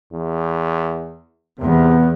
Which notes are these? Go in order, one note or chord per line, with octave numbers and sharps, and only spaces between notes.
E2
E2 C3 B3